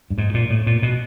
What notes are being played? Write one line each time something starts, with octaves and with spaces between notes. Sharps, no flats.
G2
G#2
A#2
A2
A#2
B2